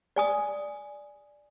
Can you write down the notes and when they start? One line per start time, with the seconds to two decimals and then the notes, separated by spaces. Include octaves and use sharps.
0.16 D5 G#5 D#6